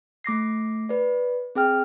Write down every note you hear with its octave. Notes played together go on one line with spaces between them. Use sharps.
A3 D6 A#6 C7
B4 D5
C4 G#4 G5 F6